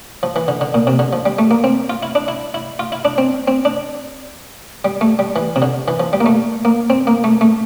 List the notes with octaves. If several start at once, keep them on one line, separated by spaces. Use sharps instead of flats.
F3
E3
D3
D3
A#2
C3
D3
F3
G3
A3
A#3
C4
F4
E4
D4
E4
E4
F4
E4
D4
C4
C4
D4
G3
A3
G3
E3
C3
D3
E3
F3
G3
A#3
A3
A#3
C4
A#3
A3
A3